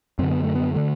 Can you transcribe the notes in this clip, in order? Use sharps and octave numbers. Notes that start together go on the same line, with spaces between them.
F#2 D3 C4
B3
A3
B3
D3 A3